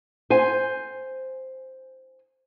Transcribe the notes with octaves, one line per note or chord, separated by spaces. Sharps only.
C5 G#5